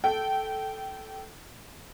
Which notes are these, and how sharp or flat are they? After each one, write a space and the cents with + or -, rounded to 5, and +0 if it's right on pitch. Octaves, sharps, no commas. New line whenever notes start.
A4 -15 G5 -20